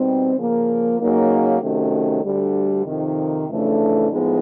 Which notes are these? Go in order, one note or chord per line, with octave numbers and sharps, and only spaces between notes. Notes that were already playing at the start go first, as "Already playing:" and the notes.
Already playing: B2 G3 C4 D#4
C#3 F3 A#3
C#3 F#3 A#3 D#4
C3 D#3 F#3 A3 C#4
D2 D3 G3
F2 C3 D#3
F2 C#3 E3 A3 D4
A2 F3 G#3 B3 D#4